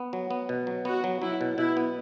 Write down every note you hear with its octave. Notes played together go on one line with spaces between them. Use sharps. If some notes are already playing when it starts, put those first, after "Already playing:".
Already playing: B3
F#3
B3
B2
F#3
B3 F#4
F#3
F#3 E4
B2
B2 E4
B3